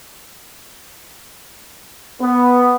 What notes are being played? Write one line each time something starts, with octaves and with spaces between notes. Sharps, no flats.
B3